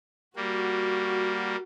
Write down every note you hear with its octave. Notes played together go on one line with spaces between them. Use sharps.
G3 A#3 F#4